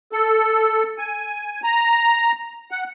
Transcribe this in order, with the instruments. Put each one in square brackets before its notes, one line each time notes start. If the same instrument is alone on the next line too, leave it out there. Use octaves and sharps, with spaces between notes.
[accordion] A4
G#5
A#5
F#5